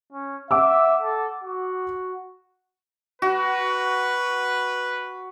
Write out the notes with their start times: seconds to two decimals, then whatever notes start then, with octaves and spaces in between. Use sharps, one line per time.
0.12 C#4
0.51 E5 F#5 D6 E6
1.02 A4
1.43 F#4
3.22 F#4 B4